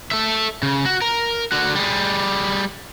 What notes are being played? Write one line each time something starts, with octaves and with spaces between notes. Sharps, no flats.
A4 E5
C#3
F#4
A#4
D3 F#4
G3 G#4